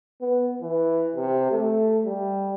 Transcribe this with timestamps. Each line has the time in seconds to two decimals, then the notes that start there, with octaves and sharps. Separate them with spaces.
0.21 B3
0.62 E3
1.16 C3
1.52 A3
2.04 G3